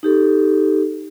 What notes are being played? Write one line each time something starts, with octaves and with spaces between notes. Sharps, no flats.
D#4 G4 A4